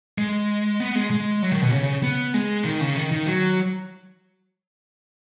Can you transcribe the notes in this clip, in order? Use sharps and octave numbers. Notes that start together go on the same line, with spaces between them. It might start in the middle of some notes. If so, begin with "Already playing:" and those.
G#3
B3
G#3
G#3
F#3
D#3
B2
C#3
C#3
B3
G#3
D#3
C#3
D#3
D#3
F#3